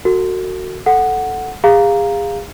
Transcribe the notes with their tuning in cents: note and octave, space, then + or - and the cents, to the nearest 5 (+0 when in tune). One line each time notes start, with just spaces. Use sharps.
F#4 +0 A4 +45
A4 +0 F#5 +0
G#4 -35 F5 +5 A#5 +0